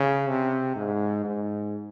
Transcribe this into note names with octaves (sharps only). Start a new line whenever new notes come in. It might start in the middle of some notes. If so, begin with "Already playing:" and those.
Already playing: C#3
C3
G#2
G#2